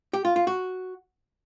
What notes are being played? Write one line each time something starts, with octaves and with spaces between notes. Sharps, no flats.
G4
F4
F4
F#4